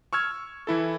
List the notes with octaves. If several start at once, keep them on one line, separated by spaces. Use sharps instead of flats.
C#6 E6 F6 G#6
E3 E4 A4